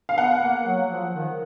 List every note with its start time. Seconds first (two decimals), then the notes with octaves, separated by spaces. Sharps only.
0.09 F5
0.17 B3 F#5
0.41 A#3
0.65 F#3
0.90 F3
1.14 D#3